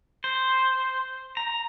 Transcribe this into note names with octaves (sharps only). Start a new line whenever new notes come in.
C5
A#5